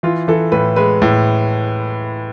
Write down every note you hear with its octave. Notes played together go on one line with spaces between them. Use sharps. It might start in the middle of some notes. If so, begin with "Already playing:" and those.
E3 F4
E3 A4
A2 B4
G#3 B4
A2